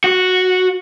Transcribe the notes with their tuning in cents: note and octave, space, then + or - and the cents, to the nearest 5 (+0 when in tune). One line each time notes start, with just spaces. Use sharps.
F#4 -5